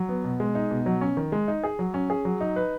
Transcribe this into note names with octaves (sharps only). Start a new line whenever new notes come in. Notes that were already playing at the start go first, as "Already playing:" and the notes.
Already playing: F#3
B3
B2
G#3
D#4
B2
F#3
C#4
D#3
G#3
D#4
G#4
F#3
C#4
G#4
F#3
D#4
B4